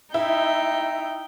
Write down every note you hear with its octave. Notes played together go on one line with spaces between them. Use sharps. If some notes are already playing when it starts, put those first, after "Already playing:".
D#4 E4 G5